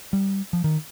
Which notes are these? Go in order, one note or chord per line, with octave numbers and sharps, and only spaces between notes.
G3
F3
D#3